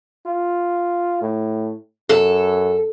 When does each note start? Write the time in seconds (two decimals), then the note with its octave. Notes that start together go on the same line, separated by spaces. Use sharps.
0.26 F4
1.22 A2
2.09 F#2 A4